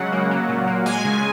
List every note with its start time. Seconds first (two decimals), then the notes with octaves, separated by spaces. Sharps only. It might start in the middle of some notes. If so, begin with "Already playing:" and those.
Already playing: C#3 F#3 G#3 F#5
0.12 A#3
0.31 F#3
0.48 A#2
0.67 A#3
0.86 G#3 G#5
1.05 C#3